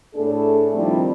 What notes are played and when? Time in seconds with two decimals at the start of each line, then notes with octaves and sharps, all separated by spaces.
0.15 A2 A3 D4 G#4 A4
0.74 D#3 F3 G3 C4 D4 E4